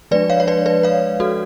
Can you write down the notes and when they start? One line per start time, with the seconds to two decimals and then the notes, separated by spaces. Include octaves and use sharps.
0.11 F3 G#3 D4 B4 D5
0.30 C#5 F5
0.40 C#5
0.48 B4 D5
0.66 B4 D5
0.83 C#5 F5
1.20 F#4 A4